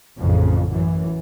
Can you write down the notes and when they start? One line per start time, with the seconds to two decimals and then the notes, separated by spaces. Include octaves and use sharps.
0.18 A1 F2 C#3
0.72 F#2 E3